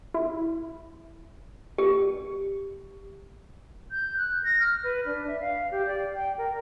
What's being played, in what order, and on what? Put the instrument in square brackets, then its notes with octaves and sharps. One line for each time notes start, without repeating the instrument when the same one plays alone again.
[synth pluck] E4
[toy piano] G4
[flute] G6
F#6
A#6
F6
B4
D4
E5
F5
G4
D5
G5
A#4